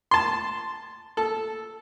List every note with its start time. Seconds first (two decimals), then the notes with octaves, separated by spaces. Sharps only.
0.11 A5 C6
1.17 A4